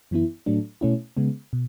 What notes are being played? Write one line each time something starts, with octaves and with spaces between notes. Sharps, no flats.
F#2 E3 B3 E4
A2 F#3 A3 D4
B2 A3 C#4 E4
C#3 G#3 B3
B2